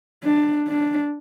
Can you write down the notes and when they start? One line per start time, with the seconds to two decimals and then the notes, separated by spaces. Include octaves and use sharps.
0.24 D4
0.68 D4